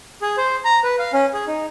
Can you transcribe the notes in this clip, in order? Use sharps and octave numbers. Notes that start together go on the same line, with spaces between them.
G#4
C5
A#5
B4
F5
C#4
G#4
D#4